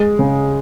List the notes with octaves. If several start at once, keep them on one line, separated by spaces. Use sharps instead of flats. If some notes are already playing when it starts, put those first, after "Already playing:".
Already playing: G#3
C#3